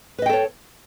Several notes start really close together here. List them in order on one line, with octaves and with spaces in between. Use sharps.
B4 D#5 G5 A4 C#5